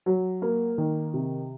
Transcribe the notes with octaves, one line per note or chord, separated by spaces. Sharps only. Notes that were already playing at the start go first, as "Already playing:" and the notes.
F#3
A#3
D#3
C3